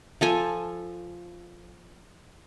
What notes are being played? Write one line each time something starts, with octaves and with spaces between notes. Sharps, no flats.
F3 A4 G#5